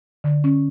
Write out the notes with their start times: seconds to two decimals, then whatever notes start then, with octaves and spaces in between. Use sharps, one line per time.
0.24 D3
0.44 C#4